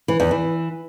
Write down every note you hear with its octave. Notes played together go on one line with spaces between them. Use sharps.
E3
E2
E3